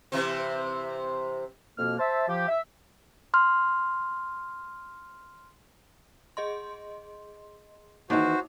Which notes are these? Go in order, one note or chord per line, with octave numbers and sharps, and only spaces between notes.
C3 E3 C4
F2 B2 A#3 F6
C5 E5 A5
F3 G4
E5
C6 F6
G#4 D#5 C6
D#3 E3 A#3 D#4 F#4 C5